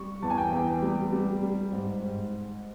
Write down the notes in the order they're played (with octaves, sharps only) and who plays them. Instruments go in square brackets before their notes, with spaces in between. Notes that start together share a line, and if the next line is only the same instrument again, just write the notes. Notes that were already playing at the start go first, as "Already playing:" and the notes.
Already playing: [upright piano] G3 C#6
E2 A5
G#5
G5
E2
G3
G3
G3
G#2
G#2